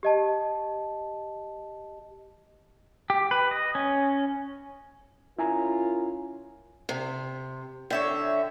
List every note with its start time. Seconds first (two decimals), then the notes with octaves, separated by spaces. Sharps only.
0.03 G4 D#5 A5
3.10 G4
3.31 B4
3.51 D#5
3.75 C#4
5.39 C#4 E4 F4 A#4 G#5 A#5
6.89 C3
7.90 D3 C#5 E5 G5